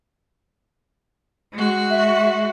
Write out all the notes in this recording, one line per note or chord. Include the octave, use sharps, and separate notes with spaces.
G#3 F#4
E5